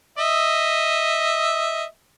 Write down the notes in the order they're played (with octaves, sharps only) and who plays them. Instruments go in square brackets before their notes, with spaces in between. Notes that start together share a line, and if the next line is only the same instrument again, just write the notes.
[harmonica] D#5 E5